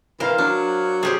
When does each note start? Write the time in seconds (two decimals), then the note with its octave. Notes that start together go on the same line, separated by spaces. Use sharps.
0.20 E3 A#4 C5 F5
0.38 F#3 D4
1.03 F3 B3 C4 G4 G#4